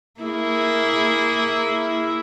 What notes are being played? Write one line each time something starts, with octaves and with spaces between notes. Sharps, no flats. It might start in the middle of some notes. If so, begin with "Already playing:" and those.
A#3 E4 G#4